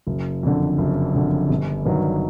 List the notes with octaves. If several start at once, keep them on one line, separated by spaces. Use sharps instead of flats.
F#1
F2 D3
F#1
F2 D3
G1
G2 D#3 F#3